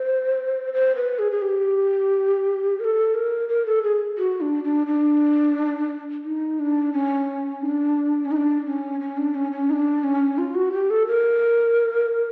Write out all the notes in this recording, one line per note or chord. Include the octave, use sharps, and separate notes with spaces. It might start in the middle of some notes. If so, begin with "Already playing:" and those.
Already playing: C5
C5
B4
G#4
G#4
G4
A#4
A4
A#4
A#4
A4
G#4
F#4
D4
D4
D4
D#4
D4
C#4
D#4
D4
C#4
D#4
D4
C#4
C#4
D4
C#4
C#4
D#4
D4
C#4
F4
F#4
G4
A4
A#4